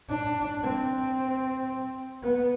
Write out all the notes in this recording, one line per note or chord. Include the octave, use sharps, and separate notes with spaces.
D4
C4
B3